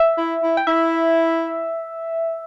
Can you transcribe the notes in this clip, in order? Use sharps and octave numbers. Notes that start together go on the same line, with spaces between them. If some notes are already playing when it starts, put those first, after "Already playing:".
Already playing: E5
E4
E4
G5
E4 E5